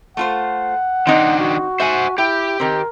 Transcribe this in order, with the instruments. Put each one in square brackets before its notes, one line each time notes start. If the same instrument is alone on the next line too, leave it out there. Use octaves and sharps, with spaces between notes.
[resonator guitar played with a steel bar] A3 F4 C5 [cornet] F#5
[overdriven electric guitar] D#3 D4 [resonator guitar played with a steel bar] C4 D#4
[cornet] F#4
[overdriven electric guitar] C5 F#5 [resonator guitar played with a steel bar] E5 G#5
[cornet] E4 [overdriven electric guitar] G4 [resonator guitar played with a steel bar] G5
[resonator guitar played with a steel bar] D#3 C4 [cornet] A#4